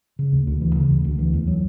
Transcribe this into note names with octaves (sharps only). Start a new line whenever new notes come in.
C#3
D2
D2
E3
C#3
D2
D2
E3
E2
F#3